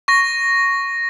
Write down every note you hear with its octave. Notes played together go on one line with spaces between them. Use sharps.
C#6 A#6